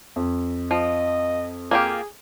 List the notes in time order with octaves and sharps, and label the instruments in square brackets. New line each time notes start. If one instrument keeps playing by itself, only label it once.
[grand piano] F2
[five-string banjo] F3 [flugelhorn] D#5
[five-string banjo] A#3 F4 G4 [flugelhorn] G#4